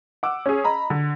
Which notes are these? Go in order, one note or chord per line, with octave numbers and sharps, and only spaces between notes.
F#5 D6 E6
C#4 G#4
D#5 A#5 B5
D3